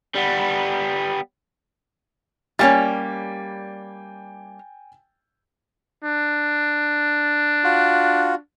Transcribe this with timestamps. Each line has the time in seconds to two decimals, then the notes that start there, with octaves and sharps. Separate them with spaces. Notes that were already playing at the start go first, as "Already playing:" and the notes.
0.15 G3 B3
2.59 G3 A#3 C#4 G5 G#5 A6
6.04 D4
7.64 F4 F#4